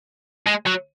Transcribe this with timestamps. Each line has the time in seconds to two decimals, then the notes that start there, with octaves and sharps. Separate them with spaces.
0.47 G#3
0.67 F#3